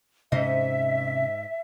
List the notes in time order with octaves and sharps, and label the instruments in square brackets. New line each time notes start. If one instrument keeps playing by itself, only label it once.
[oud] G#2 C5 D#5 [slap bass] C3 C#4 [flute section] E5